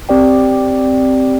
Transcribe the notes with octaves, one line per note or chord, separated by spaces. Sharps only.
C4 G4 D5 G5